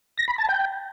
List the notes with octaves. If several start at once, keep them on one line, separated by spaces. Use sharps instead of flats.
A#6
B5
A5
G5